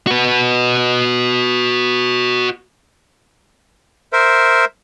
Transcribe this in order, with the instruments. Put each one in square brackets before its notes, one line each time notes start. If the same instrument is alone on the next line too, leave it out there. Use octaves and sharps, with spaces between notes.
[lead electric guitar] F#4 B4
[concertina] A#4 C5 E5